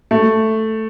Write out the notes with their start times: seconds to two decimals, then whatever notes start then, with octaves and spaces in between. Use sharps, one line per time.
0.11 A3